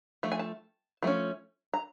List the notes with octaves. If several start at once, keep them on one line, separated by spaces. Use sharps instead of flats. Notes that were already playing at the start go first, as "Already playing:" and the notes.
F3 A3
G#5
A5
F3 A3 C#4
A#5